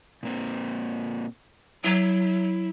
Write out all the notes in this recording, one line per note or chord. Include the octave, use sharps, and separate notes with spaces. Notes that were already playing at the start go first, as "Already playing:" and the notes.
A#2 A#3 C4
F#3 E4